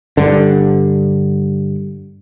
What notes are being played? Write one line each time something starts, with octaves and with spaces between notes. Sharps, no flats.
G2 D3